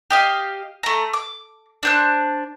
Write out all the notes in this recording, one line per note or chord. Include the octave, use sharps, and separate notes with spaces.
G4 D#5 F5
A3 A#5
D6
D4 C5 F#6